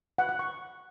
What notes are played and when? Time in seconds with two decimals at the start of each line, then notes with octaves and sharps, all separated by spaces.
0.18 F#5
0.29 F#5
0.39 C#6